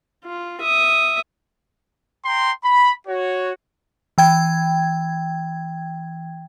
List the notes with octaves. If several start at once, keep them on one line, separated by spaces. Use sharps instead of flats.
F4
E5 D#6
G5 A#5 C6
B5
F#4 C#5
E3 G5 G#6